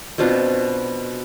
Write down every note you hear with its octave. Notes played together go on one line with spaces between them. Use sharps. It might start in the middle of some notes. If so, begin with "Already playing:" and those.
B2 C4 D4 F4